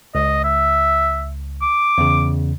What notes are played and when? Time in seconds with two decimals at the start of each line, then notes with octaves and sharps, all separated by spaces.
0.15 C#2 D#5
0.44 E5
1.62 D6
1.98 E2 C#3